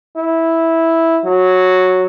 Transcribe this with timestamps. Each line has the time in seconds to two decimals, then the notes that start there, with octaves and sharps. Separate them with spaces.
0.17 E4
1.25 F#3